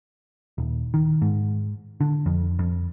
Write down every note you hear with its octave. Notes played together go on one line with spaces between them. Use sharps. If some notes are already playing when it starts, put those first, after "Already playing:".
D#1
D#3
G#2
D3
F2
F2